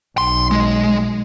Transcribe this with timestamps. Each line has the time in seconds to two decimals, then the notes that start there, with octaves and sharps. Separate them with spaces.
0.18 B1 C6
0.51 G#3